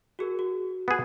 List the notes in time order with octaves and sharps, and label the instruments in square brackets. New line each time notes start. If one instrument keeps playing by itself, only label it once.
[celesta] F#4 G#4 A#4
F#4
[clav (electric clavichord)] B3 G#4